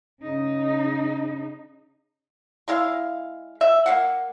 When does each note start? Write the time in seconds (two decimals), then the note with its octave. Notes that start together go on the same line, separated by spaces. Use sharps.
0.22 C#3 D#4
2.68 G#3 E4 F5
3.61 E5
3.86 A#3 F5 F#5